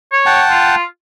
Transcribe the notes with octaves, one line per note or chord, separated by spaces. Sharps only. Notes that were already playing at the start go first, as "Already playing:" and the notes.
C#5
F#5 G5 A5
F4